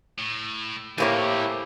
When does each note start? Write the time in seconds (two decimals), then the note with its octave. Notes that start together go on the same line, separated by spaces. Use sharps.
0.18 A2
0.98 A2 C3 A3 A#3 E4 G4 C#5 G#5